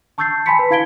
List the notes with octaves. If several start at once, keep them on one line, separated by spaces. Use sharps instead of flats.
A5 C#6 E6 G6 A6 C7
G#5 A5 B5 C6 B6 C#7
B4
E4 F5 G#6 B6 D7 G7